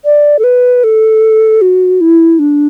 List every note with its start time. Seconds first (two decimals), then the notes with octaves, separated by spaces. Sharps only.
0.05 D5
0.39 A4
0.44 B4
0.84 A4
1.62 F#4
2.01 E4
2.39 D4